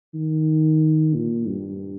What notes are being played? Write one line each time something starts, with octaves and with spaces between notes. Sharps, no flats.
D#3
A#2
G2